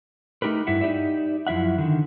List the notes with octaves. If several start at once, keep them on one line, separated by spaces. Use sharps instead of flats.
A3 D#4 G4 A#4 B4
G2 E4 E5 F#5
D#4 G4 D5 E5
F#2 F3 E4 E5 F#5
D3 D#3